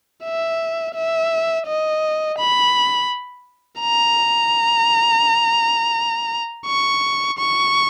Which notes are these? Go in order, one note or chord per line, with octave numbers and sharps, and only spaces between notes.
E5
E5
D#5
B5
A#5
C#6
C#6